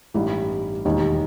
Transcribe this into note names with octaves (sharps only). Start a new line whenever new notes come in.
A1 G2 E3 G3 D#4
E1 D#2 D#3 G3 D#4